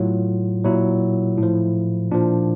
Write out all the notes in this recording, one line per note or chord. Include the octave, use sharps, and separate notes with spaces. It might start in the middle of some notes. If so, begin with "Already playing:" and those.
Already playing: A2 F#3 F4
A#2 F#3 E4
A2 F3
A#2 F3 D4